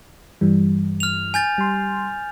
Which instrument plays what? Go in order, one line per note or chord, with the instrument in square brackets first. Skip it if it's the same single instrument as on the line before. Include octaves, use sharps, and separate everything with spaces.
[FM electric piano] G2 E3 G3
[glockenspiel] F6 F7
G#5 G6 A6
[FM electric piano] G3 C6